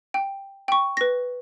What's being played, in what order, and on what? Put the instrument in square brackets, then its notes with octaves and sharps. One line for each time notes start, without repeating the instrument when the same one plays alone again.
[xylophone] G5
G5 C#6
B4 A#6